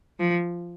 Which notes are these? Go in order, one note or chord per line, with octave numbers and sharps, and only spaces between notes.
F3